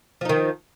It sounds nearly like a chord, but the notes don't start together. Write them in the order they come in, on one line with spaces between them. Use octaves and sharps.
F3 D#4 D#3